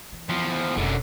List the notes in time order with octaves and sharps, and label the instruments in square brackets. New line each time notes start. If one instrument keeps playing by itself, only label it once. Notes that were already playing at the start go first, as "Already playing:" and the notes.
[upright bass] E3
[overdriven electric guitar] E2 F3
[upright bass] F1 B1 [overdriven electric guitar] F#2 D3